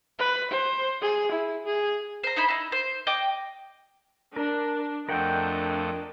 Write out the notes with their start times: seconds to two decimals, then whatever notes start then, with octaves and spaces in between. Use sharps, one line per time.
0.19 B4
0.51 C5
1.01 G#4
1.31 E4
1.66 G#4
2.23 C5 A#5
2.36 D#4 E4 C5 B5
2.48 D#4 E4
2.72 C5
3.07 D#5 G5 D6
4.36 D4 A#4
5.09 F2 A3 D4 A#4 D#5 F#5 G5